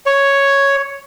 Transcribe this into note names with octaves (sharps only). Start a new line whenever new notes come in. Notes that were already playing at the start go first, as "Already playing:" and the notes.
C#5